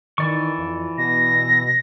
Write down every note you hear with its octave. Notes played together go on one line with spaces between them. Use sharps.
D#3 E3 D5 C#6
F2
B2 A#6